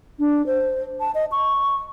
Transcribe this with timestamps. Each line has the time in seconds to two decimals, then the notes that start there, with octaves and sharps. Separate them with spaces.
0.19 D4
0.46 C5
1.00 A5
1.15 D#5
1.32 C#6